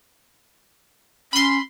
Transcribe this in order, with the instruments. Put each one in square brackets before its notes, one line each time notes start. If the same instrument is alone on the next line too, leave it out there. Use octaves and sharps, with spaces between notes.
[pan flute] C#4 [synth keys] B5 C6